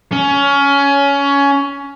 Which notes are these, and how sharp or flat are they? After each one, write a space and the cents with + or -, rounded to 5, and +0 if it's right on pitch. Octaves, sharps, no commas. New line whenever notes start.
C#4 +20